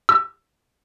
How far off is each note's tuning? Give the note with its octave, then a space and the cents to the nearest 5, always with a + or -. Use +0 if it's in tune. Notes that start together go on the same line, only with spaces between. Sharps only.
E6 +20